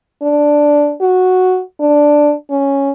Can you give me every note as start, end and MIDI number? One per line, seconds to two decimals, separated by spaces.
0.22 0.93 62
1.01 1.62 66
1.80 2.33 62
2.50 2.92 61